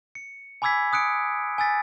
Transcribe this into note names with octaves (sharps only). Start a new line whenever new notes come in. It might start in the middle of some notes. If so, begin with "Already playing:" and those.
C#7
G#5 B5 D6 E6 G#6 B6
D#6 F#6 C#7 D7
G#5 E6 A6 B6